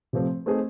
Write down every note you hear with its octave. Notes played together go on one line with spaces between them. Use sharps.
C3 F3 A3 C4
A3 C4 D#4 G#4 C5